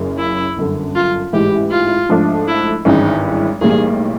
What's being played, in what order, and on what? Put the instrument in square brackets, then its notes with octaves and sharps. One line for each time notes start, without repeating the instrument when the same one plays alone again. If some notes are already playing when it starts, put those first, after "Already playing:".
Already playing: [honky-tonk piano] F#1 F#2 C#3
[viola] E4
[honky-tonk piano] G1 F#2 D3
[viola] F4
[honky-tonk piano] A1 G#2 E3 G#3 [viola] G4
[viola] F4
[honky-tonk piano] G#2 F3 A3 D4
[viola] E4
[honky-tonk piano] G#1 G2 E3 G#3 C#4 [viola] D#4
[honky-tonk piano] B1 A2 E3 G3 A#3 [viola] G#4